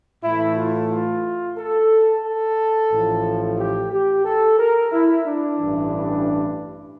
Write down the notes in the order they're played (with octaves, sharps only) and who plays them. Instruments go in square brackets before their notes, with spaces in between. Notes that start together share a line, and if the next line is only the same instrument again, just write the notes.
[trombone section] A2 E3 A3 E4
F4
F4
A4
A4
A1 A2 F3
G4
G4
A4
A#4
E4
D4
A1 G2 E3